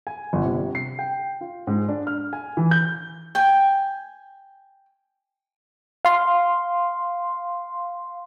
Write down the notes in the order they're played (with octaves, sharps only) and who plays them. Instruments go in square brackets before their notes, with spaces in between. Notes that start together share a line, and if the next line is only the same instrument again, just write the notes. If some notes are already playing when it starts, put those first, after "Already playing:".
[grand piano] G#5
G1
C3
C7
G5
F4
G#2
D4
F6
G#5
E3
G6
[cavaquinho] G5 G#5
[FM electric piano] F5 C6